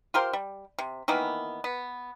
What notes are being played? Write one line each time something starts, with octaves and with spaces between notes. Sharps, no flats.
F4 G4 A#4 C5
G3
C3
D#3 E3 A#3 B3
B3